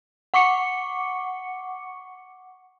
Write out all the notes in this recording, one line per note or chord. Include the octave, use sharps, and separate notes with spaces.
F#5 C#6 D6 C#7